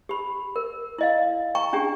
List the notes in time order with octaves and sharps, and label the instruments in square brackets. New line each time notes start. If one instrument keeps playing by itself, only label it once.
[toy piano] G4 B5
A#4
E4 D#5 F5
G5 A#5 C#6
C#4 D4 F4 G4 G#4